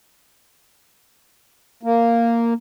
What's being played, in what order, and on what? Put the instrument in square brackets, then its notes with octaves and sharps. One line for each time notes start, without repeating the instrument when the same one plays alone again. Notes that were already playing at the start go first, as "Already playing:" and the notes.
[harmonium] A#3